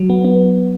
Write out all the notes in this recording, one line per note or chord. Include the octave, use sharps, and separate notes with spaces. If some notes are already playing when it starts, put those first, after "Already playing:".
Already playing: F#3
B3
B3